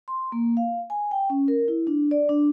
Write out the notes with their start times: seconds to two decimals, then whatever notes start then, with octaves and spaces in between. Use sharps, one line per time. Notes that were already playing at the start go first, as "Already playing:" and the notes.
0.08 C6
0.32 A#3
0.57 F5
0.90 G#5
1.11 G5
1.30 C#4
1.48 A#4
1.68 E4
1.87 D4
2.11 D5
2.29 D4